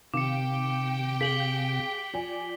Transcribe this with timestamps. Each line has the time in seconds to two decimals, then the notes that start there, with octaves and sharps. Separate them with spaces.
0.14 C3 D#3 G4 F5 G5 D6 C#7
1.21 G#4 F5 B6 F#7 G7
2.13 F3 D5 G#5